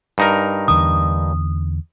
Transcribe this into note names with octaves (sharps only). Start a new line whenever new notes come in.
G2 D#4 A#4
E2 D3 D#6